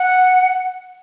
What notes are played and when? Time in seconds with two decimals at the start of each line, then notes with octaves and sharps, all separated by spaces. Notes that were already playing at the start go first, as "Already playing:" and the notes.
Already playing: F#5